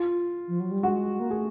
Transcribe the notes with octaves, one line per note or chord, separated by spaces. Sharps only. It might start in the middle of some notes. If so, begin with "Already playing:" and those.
Already playing: F4
F3
F#3
G3
G#3 F#4
A#3
A3 G#4